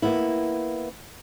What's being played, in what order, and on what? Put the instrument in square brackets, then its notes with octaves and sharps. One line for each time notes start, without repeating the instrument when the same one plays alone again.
[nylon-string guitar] A#3 B3 E4